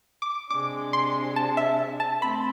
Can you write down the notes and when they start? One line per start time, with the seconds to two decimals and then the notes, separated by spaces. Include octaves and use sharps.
0.22 D6
0.50 C3 G#3 D4 D6
0.93 C6
1.36 A5
1.57 E5
2.00 A5
2.21 A3 C4 B5